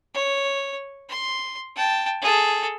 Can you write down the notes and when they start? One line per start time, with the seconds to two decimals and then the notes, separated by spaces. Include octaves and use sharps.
0.14 C#5
1.09 C6
1.76 G5 A5
2.22 G#4 A4